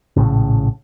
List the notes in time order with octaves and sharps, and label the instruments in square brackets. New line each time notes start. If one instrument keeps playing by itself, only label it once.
[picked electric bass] A#1 A2 C#3